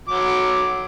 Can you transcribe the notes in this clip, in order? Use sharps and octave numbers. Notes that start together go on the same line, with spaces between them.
F#3 D6